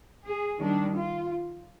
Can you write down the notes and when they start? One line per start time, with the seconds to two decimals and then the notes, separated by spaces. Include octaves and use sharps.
0.26 G#4
0.60 D#3 G3 D4
0.97 F4